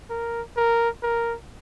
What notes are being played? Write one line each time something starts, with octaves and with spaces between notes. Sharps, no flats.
A#4
A#4
A#4